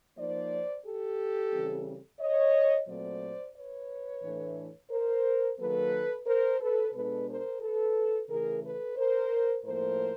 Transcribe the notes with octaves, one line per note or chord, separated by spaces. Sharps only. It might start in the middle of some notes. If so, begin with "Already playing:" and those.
F3 A#3 D#4 C5 D5
G4 A4
C#3 E3 G3 C4
C#5 D#5
A#2 F#3 A3 C4 C5 D5
B4 C#5
A2 E3 A3 D4
A#4 C5
D#3 F#3 A#3 A4 B4
A#4 C5
A4 B4
B2 G#3 B3 D4 A4 B4
A#4 C5
A4 B4
C#3 E3 A3 G#4 A#4
A4 B4
A#4 C5
A2 F3 A#3 A#4 C5